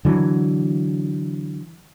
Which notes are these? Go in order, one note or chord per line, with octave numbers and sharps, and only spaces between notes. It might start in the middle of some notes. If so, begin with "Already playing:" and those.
D3 E3 F#3